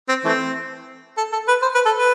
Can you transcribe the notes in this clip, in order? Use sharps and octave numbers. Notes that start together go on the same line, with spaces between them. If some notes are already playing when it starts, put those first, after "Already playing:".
C4
E3 A3 C4
A4
A4
B4
C5
B4
A4
B4